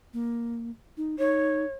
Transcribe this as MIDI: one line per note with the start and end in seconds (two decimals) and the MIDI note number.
0.14 0.71 58
0.97 1.16 63
1.19 1.65 63
1.19 1.73 73